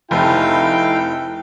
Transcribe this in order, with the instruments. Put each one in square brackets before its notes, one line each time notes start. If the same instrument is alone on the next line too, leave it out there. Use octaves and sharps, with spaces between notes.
[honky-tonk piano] F1 [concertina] D#4 A4 F5 [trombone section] E4 [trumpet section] G5